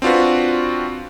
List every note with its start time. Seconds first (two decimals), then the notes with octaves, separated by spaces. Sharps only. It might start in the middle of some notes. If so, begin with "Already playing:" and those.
0.02 C4 D4 F4 F#4 B4